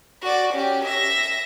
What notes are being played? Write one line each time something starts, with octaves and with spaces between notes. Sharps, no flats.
F#4 D5
C#4 G4
E5 A#6